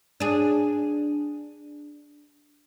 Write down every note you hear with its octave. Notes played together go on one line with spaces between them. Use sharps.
D4 G#4